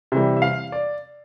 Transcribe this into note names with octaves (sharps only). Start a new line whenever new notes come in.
C3 E3 G3
E5
F5
D5